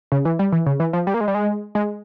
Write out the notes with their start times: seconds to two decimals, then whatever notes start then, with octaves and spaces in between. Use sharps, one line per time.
0.12 C#3
0.25 E3
0.39 G3
0.52 E3
0.66 C#3
0.80 E3
0.93 F3
1.07 G3
1.14 A#3
1.21 G#3
1.28 G3
1.35 G#3
1.75 G#3